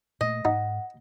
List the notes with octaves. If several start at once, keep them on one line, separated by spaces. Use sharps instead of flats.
A#2 A3 A#3 D#5
G#2 D#4 F#5